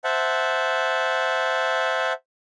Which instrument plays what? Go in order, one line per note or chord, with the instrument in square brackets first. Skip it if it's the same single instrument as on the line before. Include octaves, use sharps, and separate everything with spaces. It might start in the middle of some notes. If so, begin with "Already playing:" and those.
[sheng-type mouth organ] C5 E5 F#5 A5